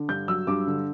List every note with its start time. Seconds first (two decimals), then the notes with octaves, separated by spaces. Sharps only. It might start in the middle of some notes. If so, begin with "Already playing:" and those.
Already playing: D3
0.08 G2 G6
0.28 F#3 E6
0.47 G2 D6
0.67 D3